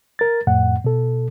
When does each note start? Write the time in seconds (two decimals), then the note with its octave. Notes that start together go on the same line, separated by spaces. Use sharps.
0.19 A#4 A6
0.47 F2 A2 F#5
0.84 B2 A4